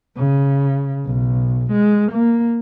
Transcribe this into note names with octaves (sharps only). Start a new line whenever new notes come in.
C#3
B1
G#3
A#3